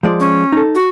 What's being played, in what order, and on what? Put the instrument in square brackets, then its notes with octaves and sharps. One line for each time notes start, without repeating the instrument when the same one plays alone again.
[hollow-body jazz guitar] F3 G#3 D5
[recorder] C#4
[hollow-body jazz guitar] D#4 A4
[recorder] F#4